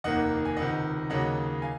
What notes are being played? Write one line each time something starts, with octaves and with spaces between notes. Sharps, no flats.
F1 D#2 D#3 A#3 D#5 F#5
G#5
C#2 C3 D#3 D#5 F#5
D#2 C#3 F#3 A#3 D#5 F#5
F5 G#5